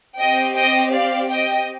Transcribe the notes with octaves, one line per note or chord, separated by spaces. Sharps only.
C4 G4 D#5 G5
D#5 G5
D5 F5
D#5 G5